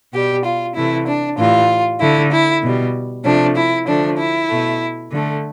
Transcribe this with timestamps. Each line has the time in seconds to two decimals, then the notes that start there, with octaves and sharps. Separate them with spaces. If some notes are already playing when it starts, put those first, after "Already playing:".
0.13 B2 G3 G4
0.44 F4
0.75 C3 E3 A3 E4
1.06 D4
1.37 A2 E3 G3 F4
2.00 D3 A3 E4
2.31 E4
2.62 B2 G3
3.24 C3 F3 A3 D4
3.55 E4
3.86 D3 F3 A3 D4
4.17 E4
4.49 B2 A3
5.11 D3 A3